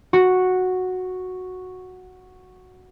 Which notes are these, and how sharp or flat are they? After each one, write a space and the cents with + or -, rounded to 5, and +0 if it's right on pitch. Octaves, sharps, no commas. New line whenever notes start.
F#4 -5